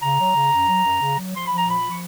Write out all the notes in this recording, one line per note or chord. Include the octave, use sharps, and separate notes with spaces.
C#3 A#5
F#3
C#3
F#2
F#3
F#2
C#3
F#3
F3 C6
F3 B5
A#5
A#2 B5
F3
C#6